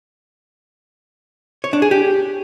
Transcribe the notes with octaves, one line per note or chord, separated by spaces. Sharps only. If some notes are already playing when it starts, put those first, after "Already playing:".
C#5
D4
G#4
G4